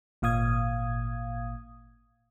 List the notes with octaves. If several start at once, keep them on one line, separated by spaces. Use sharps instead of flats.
G#1 A#2 F5 D#6 G#6